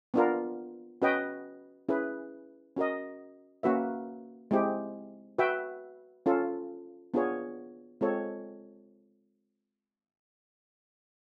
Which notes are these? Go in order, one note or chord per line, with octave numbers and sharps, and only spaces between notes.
B3 D4 F4 A#4
C#4 F#4 B4 D#5 G5
C#4 E4 G#4 B4
C#4 F#4 A#4 D#5
A#3 C#4 F#4 B4 E5
G#3 C4 E4 G4
F#4 B4 E5 G5
C#4 F4 A4
B3 D4 F4 G#4 C#5
G#3 C4 F4 A4 C#5